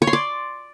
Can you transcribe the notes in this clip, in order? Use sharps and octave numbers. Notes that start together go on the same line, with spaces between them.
C#5
C6
D5